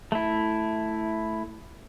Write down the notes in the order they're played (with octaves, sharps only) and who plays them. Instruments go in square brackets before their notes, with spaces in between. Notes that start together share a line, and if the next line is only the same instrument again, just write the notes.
[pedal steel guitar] A3 E4